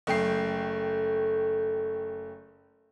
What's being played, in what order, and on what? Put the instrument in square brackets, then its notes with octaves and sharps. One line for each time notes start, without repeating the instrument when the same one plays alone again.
[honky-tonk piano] F#1 A3 G5 C7